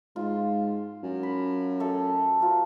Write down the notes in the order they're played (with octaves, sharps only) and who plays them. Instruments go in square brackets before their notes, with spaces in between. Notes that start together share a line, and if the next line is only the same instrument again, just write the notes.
[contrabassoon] G#2 [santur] F4
[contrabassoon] F#2
[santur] B5
A3 A4
F#3 F4 A#4